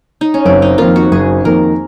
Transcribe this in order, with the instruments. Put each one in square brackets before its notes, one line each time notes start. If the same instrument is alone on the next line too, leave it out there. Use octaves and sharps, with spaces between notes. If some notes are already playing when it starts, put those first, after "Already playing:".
[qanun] D#4
C#4
[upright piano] F#1 [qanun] C4
[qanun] D#4
[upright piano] F2 D#3 A#3 [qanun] F4
[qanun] F#4
[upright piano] F#1 [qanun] G#4
[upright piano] F2 D#3 A#3 [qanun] A#4